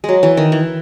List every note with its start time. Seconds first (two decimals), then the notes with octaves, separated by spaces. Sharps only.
0.04 F#3 G#3
0.23 E3
0.37 D#3
0.52 E3